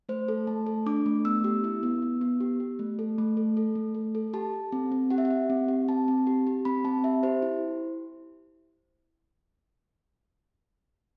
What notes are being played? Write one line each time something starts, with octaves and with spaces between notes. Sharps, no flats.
A3 C5
A4
A3 A5
A4
D4 D6
A3
B3 E6
G4
E4
B3
B3
B3
G4
G4
A3
A4
A3
A4
A4
A3
A4
A4
G4 A5
G4
C4
C4
G4 F#5
E5
F#5
G4
C4
G4
C4 A5
C4
G4
G4
C4 B5
C4 A5
G4 E5
G4 C5
E4